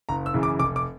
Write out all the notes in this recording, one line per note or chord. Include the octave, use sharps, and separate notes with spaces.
F#1 A#5
E6
F#2 C#3 E3
D6
F1 D6
D6